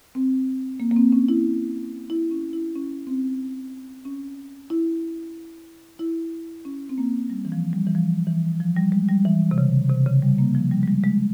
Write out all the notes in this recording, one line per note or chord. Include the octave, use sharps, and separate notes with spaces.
C4
A#3
A#3
C4
C#4
E4
E4
C#4
E4
C#4
C4
C#4
E4
E4
C#4
C4
A#3
G3
E3
F3
G3
E3
F3
E3
F3
G3
G#3
G3
E3
C3
C#3
C3
C#3
G3
A#3
F3
G3
G#3
G3
G#3